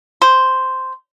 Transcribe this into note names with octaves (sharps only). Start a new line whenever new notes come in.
C5